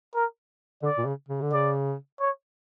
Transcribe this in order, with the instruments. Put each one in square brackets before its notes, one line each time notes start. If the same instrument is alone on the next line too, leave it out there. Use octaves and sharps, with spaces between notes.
[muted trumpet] A#4
[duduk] D3 [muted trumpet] D5
[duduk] A#2
C#3
C#3
D3
[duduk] C#3 [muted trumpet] D5
[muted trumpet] C#5